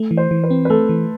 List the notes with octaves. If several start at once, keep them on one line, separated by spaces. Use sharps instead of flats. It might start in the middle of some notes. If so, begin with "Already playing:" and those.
Already playing: A3
E3
C5
E3
B4
C4
B4
A3 A4
E3